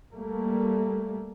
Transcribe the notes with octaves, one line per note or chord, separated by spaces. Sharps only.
G3 A3 A#3